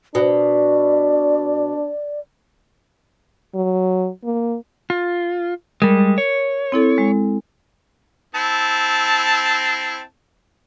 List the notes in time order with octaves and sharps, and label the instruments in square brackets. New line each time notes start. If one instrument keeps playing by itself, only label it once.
[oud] B2 [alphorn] D4 [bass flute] D5
[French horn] F#3
A#3
[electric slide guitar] F4
[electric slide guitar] G3 G#3 [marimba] A#4
[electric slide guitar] C#5
[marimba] C4 E4 A4
G#3
[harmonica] C4 E4 A5